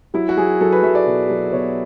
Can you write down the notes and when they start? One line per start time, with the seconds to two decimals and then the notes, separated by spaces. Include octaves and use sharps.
0.14 F#3 E4
0.29 F#4
0.37 F#3 G#4
0.60 F#3 A4
0.72 B4
0.83 F#3 E5
0.95 D5
1.06 B2
1.29 F#3
1.52 B2 C#5